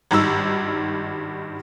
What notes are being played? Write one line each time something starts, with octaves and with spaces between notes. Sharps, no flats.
G#1 G2 D#3 E6